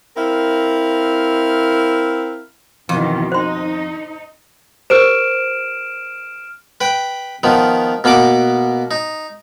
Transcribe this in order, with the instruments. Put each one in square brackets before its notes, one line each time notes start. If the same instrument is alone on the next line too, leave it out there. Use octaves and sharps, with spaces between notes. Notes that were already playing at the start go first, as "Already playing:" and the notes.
[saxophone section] C4 E4 A#4 F5
[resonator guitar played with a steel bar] F2 [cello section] B2 D#3 E3
[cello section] D#4 [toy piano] C5 C6
[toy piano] G4 A#4 C5 [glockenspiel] F6 D7 E7
[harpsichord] B4 G5
D#3 F3 B3
B2 A#3 B3 F#5 D6
D#4